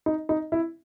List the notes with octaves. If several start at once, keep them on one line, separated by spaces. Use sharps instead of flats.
D#4
D#4
E4